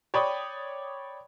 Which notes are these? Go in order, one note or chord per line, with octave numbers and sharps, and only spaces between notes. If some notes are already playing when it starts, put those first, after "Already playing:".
C#5 D5 G5 B5 C#6 D#6